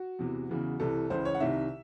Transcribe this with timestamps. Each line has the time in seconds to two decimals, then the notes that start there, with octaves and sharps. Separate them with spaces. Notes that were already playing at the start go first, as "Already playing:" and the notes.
Already playing: F#4
0.19 E2 C3 E3
0.49 E2 C#3 E3
0.80 C2 C3 E3 A4
1.10 C#2 C#3 E3 C5
1.25 C#5
1.34 F#5
1.40 C2 C3 D#3 E5